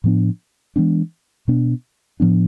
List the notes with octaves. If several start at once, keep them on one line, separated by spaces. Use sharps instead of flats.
A2 F3 B3 D4
E3 G#3 B3 D4
B2 B3 D4
A2 F3 B3 D4